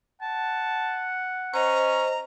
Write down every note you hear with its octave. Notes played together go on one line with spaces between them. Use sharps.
F#5 A5
C#4 C5 D#5 A#5